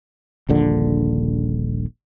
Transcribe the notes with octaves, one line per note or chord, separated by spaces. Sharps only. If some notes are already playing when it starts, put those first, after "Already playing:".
D#1 A#1 D3